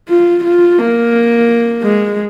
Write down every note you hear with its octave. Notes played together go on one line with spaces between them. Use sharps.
F4
F4
A#3
G#3